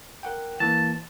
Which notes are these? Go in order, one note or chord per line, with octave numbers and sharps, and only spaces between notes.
A#4 F#5 G5
E3 A#3 A5